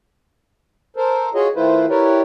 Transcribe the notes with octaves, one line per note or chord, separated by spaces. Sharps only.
A4 A#4 C5
F4 F#4 G#4 C#5 D#5
D#3 A3 E4 F4 B4 C5
E4 G4 A#4 B4 C#5 D5